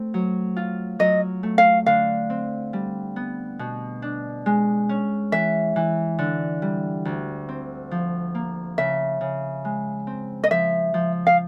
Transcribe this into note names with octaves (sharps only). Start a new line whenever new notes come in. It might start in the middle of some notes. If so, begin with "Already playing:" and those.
Already playing: A3 C4
F#3
F4
F#3 D#5
A3
F5
D3 F5
C4
G3
B3
B2
D4
G#3
C#4
E3 E5
E3
D3
G3
D2
C4
F3
A#3
C#3 E5
C#3
G#3
C4
D#5
F3 E5
F3
F5